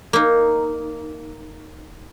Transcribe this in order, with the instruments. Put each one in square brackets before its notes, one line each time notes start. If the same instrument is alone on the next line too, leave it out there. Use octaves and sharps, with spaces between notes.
[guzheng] A#3 D#4